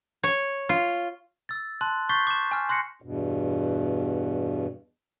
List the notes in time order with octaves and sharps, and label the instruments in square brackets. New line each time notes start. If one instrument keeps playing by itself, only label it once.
[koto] C#5
F4
[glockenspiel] E6 A6
A5 C6 F#6
C#6 G6 A6 B6 C7
D6 E7
G#5 F6
C6 F#6 A#6 C7 C#7
[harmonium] E2 G2 B2